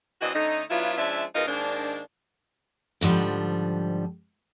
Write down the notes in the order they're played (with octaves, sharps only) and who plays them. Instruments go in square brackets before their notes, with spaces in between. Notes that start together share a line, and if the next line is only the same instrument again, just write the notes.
[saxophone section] E3 C4 D4 F#4 D#5
D3 A3 C#4 D#4
F#3 B3 D4 E4 F4
F3 G#3 C#4 D4 E5
G#2 B2 D#4 F4 A#4 D#5
G#2 D#3 A#3 D4
[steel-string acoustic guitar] G#2 D3 F3 G3